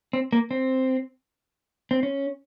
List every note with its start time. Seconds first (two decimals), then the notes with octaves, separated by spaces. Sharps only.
0.13 C4
0.32 A#3
0.51 C4
1.91 C4
2.03 C#4